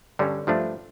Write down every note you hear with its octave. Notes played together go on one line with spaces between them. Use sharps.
G2 D3 G3 C#4
G2 F3 A3 D4